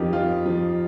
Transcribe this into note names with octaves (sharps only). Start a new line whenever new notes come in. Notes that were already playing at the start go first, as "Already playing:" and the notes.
Already playing: F2 F3 D#4 G4 A#4
F3 F4
F3